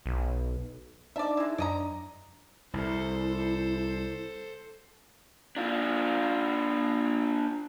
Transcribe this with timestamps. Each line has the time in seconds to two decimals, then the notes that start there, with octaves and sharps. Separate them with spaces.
0.06 B1
1.16 D4 D#4 D5 E5 A5
1.37 G#3 E4
1.58 F#2 D4 D5 D#5 A#5
2.73 C2 E4 A4 C5
5.57 D4 F4